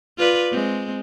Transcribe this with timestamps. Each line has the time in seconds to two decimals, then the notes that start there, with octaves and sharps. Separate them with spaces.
0.18 F4 B4 D5
0.51 G#3 C4